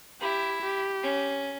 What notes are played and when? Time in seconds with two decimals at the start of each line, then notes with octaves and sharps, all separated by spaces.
0.21 E4 G4
0.62 G4
1.03 C#4